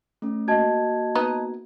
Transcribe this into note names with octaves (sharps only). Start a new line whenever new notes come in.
A3 C#4
A#3 F#4 D#5 A5 G#6
B3 D#4